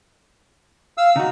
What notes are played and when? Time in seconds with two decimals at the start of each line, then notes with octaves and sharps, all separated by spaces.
0.98 F5 E6
1.16 C#3 D#4 F#4